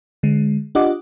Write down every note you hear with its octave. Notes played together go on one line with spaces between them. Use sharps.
D3 G#3
D4 F4 G4 D#5 F#5 D6